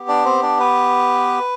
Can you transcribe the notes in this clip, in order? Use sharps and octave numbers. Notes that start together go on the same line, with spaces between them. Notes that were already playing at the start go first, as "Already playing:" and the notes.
Already playing: B3 G4
D4 D5
C4 C5
D4 D5
B4